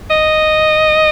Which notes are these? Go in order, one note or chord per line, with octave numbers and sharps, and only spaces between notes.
D#5